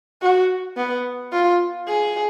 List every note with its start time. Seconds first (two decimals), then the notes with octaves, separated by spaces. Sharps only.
0.22 F#4
0.77 B3
1.32 F4
1.88 G#4